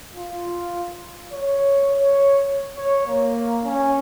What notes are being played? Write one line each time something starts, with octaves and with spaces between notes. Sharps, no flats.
F4
C#5
C#5
C#5
A#3
C#4